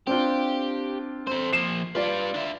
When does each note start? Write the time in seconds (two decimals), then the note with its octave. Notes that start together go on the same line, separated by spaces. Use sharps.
0.07 C4 D4 F4 G4
1.27 C4 A4 C5
1.53 F3 A#3 C7 E7
1.95 G3 F4 B4 D5
2.34 D4 E5